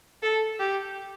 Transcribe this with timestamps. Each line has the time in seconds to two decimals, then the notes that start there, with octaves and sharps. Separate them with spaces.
0.22 A4
0.59 G4